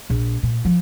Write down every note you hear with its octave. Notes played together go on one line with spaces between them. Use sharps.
A#1
A#2
F3